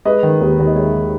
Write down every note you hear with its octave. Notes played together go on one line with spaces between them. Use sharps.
G#3 B4 D#5
D#3
D#2
D#2
D#5
G#3 C#5 E5
D#3